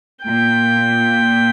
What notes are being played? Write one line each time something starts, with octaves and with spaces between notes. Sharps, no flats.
A#2 G5